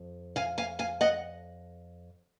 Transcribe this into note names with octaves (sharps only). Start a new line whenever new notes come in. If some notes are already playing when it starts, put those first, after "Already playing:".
Already playing: F2
F5 G#5
F5 G#5
F5 G#5
D#5 F#5